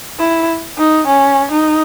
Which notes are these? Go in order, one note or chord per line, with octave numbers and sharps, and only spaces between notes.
E4
D#4
C#4
D#4